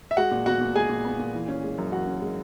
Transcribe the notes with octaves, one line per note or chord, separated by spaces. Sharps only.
E5
G#3 F#4 F#5
A#2
B3 F#4 F#5
A#2
G#3 G#4 G#5
A#2
B3
A#2
E3
C#4
G#3
F#2
E3 F#4 F#5
C#4
G#3